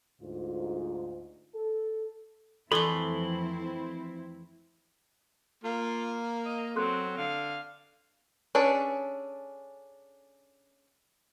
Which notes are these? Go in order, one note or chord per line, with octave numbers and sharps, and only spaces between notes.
D2 G#2 F4
A4
F2 E3 A3 C4 E4 A4 B5 C6
A#3 F4
D#5
F#3 C4 A4 C6 F#6
D3 F5
C#4 D4 G#4 A4 B4